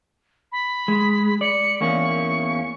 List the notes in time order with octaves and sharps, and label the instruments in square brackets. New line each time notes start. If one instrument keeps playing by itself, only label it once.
[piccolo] B5
[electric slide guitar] G#3
[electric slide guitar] D5 [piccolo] C#7
[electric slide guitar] E2 A#3 C#4 [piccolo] C#6